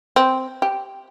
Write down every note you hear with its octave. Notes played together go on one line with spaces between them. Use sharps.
C4
G4